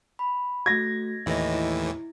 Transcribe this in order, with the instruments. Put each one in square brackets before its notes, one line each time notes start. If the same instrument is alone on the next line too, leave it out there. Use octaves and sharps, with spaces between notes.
[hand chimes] B5
[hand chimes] A3 F#4 [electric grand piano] G#6 A#6
[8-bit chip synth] D#2 A2 E3 [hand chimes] D#5 E5
[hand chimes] E4